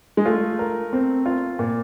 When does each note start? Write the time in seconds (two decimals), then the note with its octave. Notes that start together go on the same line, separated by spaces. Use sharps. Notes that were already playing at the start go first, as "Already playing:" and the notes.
0.17 G#3
0.26 A3 F4
0.59 A#4
0.93 C4
1.26 F4
1.59 A#2